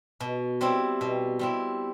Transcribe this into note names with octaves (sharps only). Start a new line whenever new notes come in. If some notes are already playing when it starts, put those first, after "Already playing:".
B2
G3 C4 E4
B2
G3 C4 E4